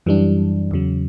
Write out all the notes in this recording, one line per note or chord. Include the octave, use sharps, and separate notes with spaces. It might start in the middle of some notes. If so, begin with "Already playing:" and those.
F#2 E3 G3 D4
E2 C#3 F#3